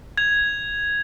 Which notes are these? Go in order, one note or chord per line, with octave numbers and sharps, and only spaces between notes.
G#6 F7